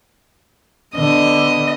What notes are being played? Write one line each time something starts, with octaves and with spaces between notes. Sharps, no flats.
D3 B3 D#5